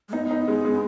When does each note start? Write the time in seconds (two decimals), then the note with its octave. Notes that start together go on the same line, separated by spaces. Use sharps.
0.09 G#3
0.13 B3 D#4
0.31 D#4
0.48 G#3
0.65 G#3